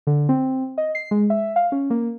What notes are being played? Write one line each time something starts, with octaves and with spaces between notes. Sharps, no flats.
D3
C4
D#5
C7
G#3
E5
F5
C#4
A#3